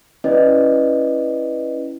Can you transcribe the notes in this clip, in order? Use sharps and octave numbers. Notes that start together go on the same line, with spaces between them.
C#4 E4 B4 D5 D#5